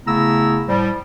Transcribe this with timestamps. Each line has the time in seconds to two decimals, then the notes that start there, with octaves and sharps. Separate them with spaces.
0.06 C#3 A3 B3 E4 A#5 E6
0.68 A2 F3 G3